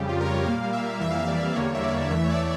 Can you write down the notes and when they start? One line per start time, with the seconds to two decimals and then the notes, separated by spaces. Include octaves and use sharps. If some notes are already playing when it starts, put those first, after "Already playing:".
Already playing: F2 C#3 G3 G4
0.09 F4
0.21 A#4
0.27 C#5
0.46 A#2 G3 A#3 F5
0.73 E5
1.01 F2 E3 G3 A#3 E5
1.10 F5
1.19 E5
1.28 D5
1.56 E2 D3 G3 A#3 C#5
1.75 E5
1.83 D5
2.10 E2 E3 A3 E5
2.24 C#5
2.29 D5